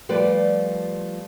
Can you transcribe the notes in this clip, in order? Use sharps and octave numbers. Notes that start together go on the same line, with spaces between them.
F3 G3 A3 B4 D5